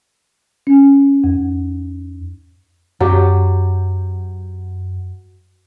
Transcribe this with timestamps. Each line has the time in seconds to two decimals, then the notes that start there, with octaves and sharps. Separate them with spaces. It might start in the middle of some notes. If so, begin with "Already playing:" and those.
0.67 C#4
1.24 F2
3.00 F#2 F#3 G4